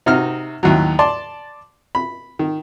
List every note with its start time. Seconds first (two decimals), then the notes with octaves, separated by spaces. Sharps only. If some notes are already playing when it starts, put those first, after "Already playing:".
0.06 C3 D#4 F#4 F6
0.63 D#2 A2 F#3
0.99 D5 A5 C6
1.95 B5
2.39 D#3